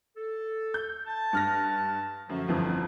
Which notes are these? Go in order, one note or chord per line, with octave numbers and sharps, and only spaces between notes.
A4
G6
A5
G2 F6 A#6
F#2 D3 F3 A3
G1 F2 E3